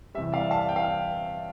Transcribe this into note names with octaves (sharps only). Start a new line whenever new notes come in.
E2 C3 G3 E5
D5 F5
F5 A5
G5
F5